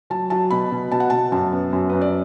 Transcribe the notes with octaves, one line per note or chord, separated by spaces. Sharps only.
F#3 A5
F#3 A5
B2 B5
B2
B2 A5
F#5
B2 A5
F#2 A5
B3
F#2
F#2 B4
D5